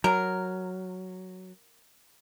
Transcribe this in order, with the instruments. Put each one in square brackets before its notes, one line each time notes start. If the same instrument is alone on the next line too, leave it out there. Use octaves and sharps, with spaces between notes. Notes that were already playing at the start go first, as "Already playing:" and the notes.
[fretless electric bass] F#3 [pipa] A#4